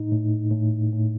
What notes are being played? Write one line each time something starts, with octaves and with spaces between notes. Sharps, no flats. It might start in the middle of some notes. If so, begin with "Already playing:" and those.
Already playing: A2 D#4
A2
A2
A2